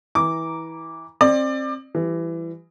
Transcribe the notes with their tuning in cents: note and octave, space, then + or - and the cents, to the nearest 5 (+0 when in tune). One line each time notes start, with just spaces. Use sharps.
E3 -20 A#5 +0 D6 -10
C4 +30 D5 +25
E3 +20 G3 -5